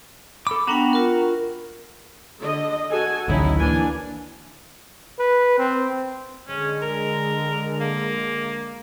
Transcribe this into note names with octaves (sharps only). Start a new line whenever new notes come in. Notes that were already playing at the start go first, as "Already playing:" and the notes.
A4 B5 D6
B3 D4 F#4 G5 A#5 B5
F4 A#4
D3 D#5
F#4 A4 G#5
A1 D2 F#3 C#4 D#4 E4
E3 A#3 D4 G#5
B4
C4
D3 G#3 C#4
A#4
A#3